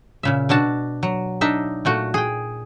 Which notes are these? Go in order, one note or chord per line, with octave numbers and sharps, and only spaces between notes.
A#2 C#3 E5
B2 D4 F#4 A5
F#3
D4 D#4 E5
A#2 A3 F#4
G#4 G5